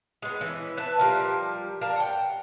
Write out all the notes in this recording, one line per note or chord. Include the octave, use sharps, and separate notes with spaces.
G#3 B3
E3 C#4
B4 E5 A5
F3 G3 F4 A#4
A#4 D5 F5 A5
F#5 G5